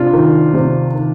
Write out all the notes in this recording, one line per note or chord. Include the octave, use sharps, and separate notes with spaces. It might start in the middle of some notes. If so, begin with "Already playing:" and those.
Already playing: C3 D4 F4
D#3
C3
D#3